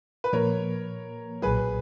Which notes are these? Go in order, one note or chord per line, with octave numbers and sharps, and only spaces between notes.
B4
A#2 F3 A#3 A#4 C#5
B1 A#2 F#3 G#4 B4